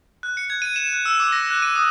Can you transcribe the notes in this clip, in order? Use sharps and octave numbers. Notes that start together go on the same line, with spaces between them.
F#6
C#7
G#6
D#7
E7
F#6
E6
D6
A#6
F#6
D#7
D#6